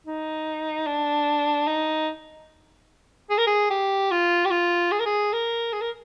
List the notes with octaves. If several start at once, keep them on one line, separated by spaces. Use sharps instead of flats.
D#4
D4
D#4
G#4
A#4
G#4
G4
F4
G4
F4
G#4
A#4
G#4
A#4
G#4
A#4